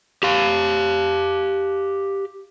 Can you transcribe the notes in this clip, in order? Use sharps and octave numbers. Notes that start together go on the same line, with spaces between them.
G4 F5